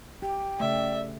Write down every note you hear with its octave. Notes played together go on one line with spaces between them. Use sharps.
G4 G5
C#3 A3 D5 E5